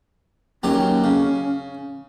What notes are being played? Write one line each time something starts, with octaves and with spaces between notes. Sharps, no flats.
D#2 F#3 C#4 G4
C#3